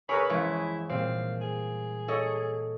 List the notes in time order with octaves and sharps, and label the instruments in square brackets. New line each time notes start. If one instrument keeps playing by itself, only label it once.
[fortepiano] G#4 A#4 B4 [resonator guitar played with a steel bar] C#5 [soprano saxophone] B5 [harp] D#6 E6
[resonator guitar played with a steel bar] F#2 F3 C#5 [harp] E3 G#3 [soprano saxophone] E4
[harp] A#2 G3 C7 [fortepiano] C4 [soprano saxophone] F5
[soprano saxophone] G#4
[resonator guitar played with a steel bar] A4 C#5 D#5